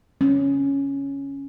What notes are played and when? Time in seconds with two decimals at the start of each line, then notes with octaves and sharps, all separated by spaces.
0.21 C#4